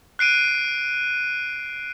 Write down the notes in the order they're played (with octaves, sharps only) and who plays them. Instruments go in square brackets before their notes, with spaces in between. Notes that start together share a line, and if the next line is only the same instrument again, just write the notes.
[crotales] F#6 C7 D7 D#7